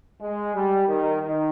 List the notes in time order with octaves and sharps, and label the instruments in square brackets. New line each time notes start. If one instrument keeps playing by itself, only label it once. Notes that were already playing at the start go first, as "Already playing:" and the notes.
[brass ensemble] G#3
G3
D#3
D#3